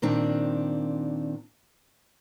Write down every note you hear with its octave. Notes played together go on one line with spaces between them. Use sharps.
A#2 D#3 C4 D4